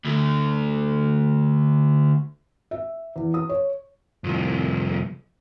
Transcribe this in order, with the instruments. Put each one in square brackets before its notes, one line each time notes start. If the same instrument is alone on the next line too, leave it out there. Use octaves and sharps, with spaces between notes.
[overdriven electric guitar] D2 D3
[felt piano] E5
E2
D#6
C#5
[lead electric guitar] C2 F2